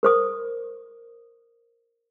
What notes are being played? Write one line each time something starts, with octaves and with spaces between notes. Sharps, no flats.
A#4 C5 D#6